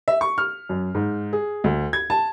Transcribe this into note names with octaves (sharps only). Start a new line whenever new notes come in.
E5
C#6
F6
F#2
G#2
G#4
D2
G#6
A5